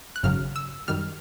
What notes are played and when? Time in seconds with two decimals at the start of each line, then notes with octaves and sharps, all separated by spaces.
0.16 F#6
0.23 G#1 F#2 C#3 F#3 F6
0.56 E6
0.88 F#2 D#3 G3 F6